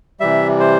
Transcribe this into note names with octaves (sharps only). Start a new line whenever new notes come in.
C3 E3 G3 E5
C5